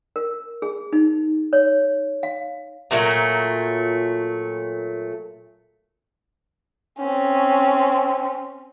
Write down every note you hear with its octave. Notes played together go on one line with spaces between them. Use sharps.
A#4
G#4
D#4
C#5
F5
A#2 F#3 A3 A#4
C4 C#4